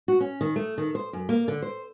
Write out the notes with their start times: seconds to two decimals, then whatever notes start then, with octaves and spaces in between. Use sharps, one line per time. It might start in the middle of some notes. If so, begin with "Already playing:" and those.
0.08 F#4
0.20 C#4
0.41 D#3
0.56 A3
0.78 D#3
0.95 C5
1.13 F#2
1.29 A#3
1.48 D3
1.62 C5